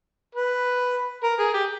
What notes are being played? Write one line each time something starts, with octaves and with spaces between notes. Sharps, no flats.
B4
A#4
G#4
G4